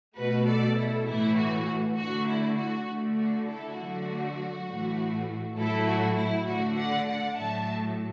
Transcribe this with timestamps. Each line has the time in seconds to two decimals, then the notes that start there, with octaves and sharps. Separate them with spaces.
0.16 B2 A3 F#4 B4
0.46 A4 D5
0.76 E4 A4
1.06 A2 E3 A3 E4
1.37 F#4
1.97 D3 A3 F#4
2.27 E4
2.56 F#4
2.87 D3 A3
3.17 F#4
3.46 E4 A4
3.77 D3 F#3 A3 F#4
4.68 A2 E3 A3
5.57 A2 F#3 A3 E4 A4
5.87 F#4
6.17 E4
6.47 D3 A3 F#4
6.77 D5 F#5
7.08 D5 F#5
7.38 A2 F#3 A3 E5 A5